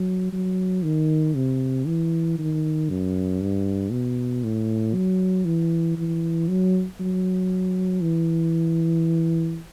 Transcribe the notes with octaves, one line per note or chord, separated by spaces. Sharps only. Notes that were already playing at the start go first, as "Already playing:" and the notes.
Already playing: F#3
F#3
D#3
C3
E3
D#3
F#2
G2
B2
A2
F#3
E3
E3
F#3
F#3
E3